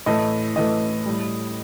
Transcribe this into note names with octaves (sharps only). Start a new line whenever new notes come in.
A2 E3 A3 D#5
A2 E3 A3 D#5
A2 G3